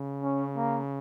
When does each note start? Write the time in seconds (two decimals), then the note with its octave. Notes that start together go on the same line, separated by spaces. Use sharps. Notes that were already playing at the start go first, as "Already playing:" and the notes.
Already playing: C#3
0.23 C#4
0.57 A#3